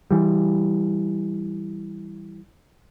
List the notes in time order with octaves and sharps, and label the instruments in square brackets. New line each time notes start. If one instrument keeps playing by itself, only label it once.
[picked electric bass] E3 G3